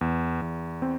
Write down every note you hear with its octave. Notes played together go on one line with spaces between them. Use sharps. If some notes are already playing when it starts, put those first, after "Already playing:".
E2
E2
C4